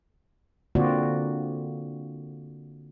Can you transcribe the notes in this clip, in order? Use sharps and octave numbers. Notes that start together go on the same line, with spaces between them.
D3 A#3 C4 F4 F#4 D5